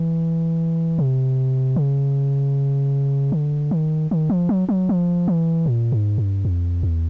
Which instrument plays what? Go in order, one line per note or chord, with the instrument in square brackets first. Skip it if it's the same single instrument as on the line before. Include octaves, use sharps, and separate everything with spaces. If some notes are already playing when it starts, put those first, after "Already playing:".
Already playing: [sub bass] E3
C3
C#3
D3
D#3
D#3
F3
F#3
F#3
F3
E3
A#2
G#2
G2
F2
E2